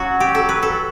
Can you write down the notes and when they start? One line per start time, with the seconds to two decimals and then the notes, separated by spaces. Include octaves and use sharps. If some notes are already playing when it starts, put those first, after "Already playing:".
Already playing: F#3 C#4 F#4
0.20 G4
0.35 A4
0.49 B4
0.63 A4